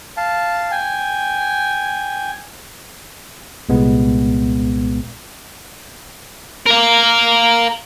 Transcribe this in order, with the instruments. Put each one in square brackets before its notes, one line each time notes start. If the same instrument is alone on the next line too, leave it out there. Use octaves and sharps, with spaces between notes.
[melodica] F5 A5
G5 G#5
[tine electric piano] C2 A#2 G#3 B3
[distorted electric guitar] A#4 F5